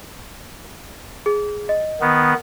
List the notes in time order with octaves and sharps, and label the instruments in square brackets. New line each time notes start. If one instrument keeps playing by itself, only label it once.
[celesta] G#4
D#5
[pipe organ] D#3 B3